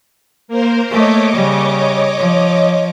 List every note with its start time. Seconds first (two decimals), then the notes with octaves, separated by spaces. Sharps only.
0.48 A#3 A#4 C5
0.91 A3 C#5 D#5 D6
1.35 C#3 G3
2.18 F3